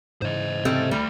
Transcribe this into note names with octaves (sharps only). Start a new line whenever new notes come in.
G#2 C#3 E3 C5 D#5
C3 G3 A3 C4
D2 G3 A3 D5